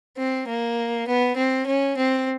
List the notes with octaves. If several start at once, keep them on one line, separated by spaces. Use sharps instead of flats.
C4
A#3
B3
C4
C#4
C4